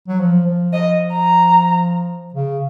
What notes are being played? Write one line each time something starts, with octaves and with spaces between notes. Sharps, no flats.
F#3
F3
F3
F3 D#5
A#5
C#3